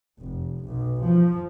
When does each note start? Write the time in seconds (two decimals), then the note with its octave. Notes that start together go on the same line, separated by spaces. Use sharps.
0.19 F1
0.64 B1
1.04 F3